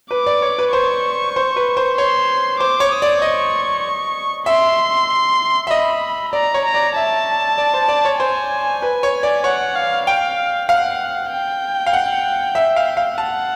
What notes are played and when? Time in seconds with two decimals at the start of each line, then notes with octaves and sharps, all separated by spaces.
0.11 B4 D6
0.26 D5
0.42 C#5
0.58 B4
0.73 C5 C#6
1.36 C5
1.56 B4
1.77 C5
1.98 C#5 C6
2.60 C5 D6
2.80 C#5
2.92 D#6
3.02 D5
3.22 D#5 C#6
4.46 E5 C6
5.67 E5
5.71 D#5 B5
6.33 D5 A#5
6.54 C#5
6.65 A#5
6.74 D5
6.96 E5 A5
7.58 D5
7.74 C5
7.88 D5
8.05 C#5
8.20 C5 G#5
8.82 B4
9.03 C#5
9.23 D5
9.44 C#5 F#5
9.75 F5
10.07 F5 G5
10.69 F5 F#5
11.31 G5
11.87 F5
11.93 F#5
12.55 E5
12.76 F5
12.97 F5
13.18 F#5 A5